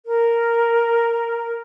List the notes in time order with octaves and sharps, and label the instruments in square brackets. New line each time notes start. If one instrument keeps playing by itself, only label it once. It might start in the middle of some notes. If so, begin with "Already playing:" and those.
[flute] A#4